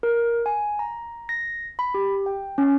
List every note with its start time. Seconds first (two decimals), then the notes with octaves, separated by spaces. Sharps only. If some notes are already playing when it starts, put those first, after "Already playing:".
0.03 A#4
0.46 G#5
0.79 A#5
1.29 A#6
1.79 B5
1.94 G4
2.26 G5
2.58 C#4